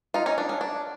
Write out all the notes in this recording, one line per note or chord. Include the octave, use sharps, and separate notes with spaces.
D#4 F4
C#4 D#4
D4
C#4
D4